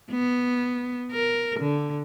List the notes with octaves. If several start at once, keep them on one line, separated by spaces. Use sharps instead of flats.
B3
A#4
D3